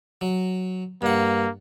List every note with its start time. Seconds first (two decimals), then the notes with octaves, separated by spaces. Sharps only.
0.21 F#3
1.02 G2 A#3 F#5